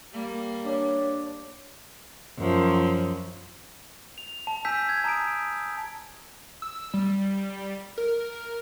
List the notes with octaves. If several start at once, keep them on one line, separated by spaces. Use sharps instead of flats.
G3 A#3
D4 C#5
F#2 F3
F7
A5
G#5 E6 G6 B6
G#6
A5 A#5 D#6 B6 D7
E6
G3
A#4